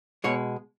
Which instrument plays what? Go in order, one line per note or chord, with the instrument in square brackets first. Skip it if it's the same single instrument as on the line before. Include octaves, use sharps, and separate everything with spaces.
[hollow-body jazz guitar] B2 G#3 C#5